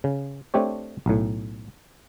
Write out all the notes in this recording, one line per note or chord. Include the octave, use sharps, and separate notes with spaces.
C#3
A3 C4 D4 G4 C#5
B1 A2